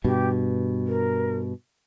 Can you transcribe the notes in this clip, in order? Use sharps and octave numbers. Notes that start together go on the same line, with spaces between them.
G2 B2 G4
A#4